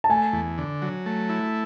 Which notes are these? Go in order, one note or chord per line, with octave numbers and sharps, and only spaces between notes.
A5
A3 G#5
E2
D3
F#3
A3
E4